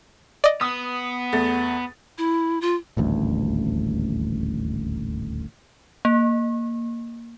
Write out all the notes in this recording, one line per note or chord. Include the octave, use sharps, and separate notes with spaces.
D5 D#5
B3 D#6
E2 A3 A6
E4
F4
D#1 A1 D2
A#3